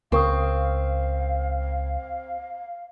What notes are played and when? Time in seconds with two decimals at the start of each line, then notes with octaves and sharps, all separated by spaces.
0.12 C#2 C4 A#4 F5 C#6 D#6